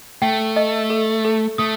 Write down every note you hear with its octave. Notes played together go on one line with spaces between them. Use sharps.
A3 G5
D#5
A4
A4
A3 D#6